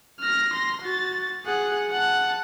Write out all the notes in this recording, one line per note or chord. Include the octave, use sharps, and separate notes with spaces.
F6 A#6
C6 A#6
F#4 A6
G#4 F#5
F#5 A5